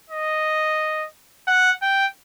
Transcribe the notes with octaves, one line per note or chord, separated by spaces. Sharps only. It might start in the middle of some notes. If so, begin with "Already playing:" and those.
D#5
F#5
G5